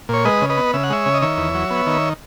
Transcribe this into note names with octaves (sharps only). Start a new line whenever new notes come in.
A#2 C#5
G#3 B4 D#5
C#3
B4 D#5
B3
C#3 E5
F#5
G#3 C#5 E5
C#3
D#5
D#3 C#5 E5
E2
F#3
B3
D#3